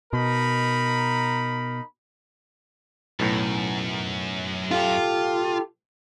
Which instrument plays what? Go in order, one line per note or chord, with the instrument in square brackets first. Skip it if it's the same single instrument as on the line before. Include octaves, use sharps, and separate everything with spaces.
[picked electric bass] B2 [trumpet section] D#4 A#4 B5
[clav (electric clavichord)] B1 A2 [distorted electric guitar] F#2
[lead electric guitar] F4 [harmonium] G4 A4